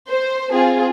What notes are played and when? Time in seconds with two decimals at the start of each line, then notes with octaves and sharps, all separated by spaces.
0.09 C5
0.52 C4 F4 G#4